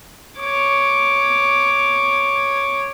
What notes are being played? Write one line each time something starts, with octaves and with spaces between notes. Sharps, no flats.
C#5 D6